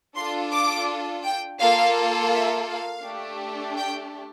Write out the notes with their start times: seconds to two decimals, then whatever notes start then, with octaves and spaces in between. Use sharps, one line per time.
0.16 D4 F4 A4 C6
0.53 D6
1.25 G5
1.60 A#3 F4 A4 F5
2.33 E5
2.69 F5
3.04 A3 D4 G4
3.77 G5